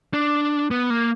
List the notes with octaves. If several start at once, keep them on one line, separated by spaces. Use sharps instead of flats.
D4
B3
A#3